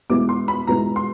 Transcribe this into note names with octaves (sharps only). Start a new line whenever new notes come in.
E2 B2 G#3 B3 E4 D6
C6
B5
E2 B2 G#3 B3 E4 A#5
C6